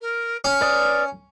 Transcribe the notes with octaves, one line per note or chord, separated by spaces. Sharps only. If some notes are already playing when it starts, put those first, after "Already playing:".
A#4
C#4 F6
B4 D5 D#6